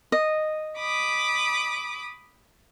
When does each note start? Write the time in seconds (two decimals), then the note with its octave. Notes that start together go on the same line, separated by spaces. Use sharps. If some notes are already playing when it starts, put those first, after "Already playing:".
0.12 D#5
0.78 B5 D6 D#6